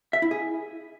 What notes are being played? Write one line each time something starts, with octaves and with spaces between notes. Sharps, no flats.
E5
E4
G#4